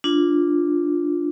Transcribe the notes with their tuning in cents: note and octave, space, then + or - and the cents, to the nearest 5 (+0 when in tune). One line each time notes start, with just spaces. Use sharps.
D4 +0 F4 +0